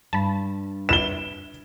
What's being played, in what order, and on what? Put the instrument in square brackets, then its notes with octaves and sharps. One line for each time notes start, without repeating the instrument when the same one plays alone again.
[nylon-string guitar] G2 [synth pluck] A5 B5
[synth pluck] E4 B4 [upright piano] E7 G7